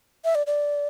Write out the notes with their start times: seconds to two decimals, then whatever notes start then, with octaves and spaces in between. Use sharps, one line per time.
0.25 E5
0.35 D5
0.47 D5